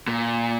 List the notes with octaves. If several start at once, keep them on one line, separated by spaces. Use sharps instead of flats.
A#2